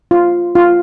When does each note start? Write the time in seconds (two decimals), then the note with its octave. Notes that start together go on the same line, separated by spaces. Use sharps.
0.11 F4
0.55 F4